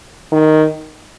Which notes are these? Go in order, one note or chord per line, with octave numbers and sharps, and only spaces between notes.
D#3